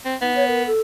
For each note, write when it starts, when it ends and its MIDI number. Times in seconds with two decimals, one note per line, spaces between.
0.05 0.15 60
0.21 0.67 59
0.21 0.33 63
0.35 0.44 73
0.47 0.62 70
0.66 0.81 69